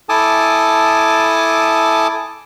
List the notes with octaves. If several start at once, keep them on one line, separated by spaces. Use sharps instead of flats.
E4 A4 G#5 A5 D6 D#6